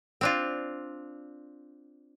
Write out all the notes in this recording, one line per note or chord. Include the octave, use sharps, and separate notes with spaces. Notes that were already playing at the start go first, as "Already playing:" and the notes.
C4 D4 F4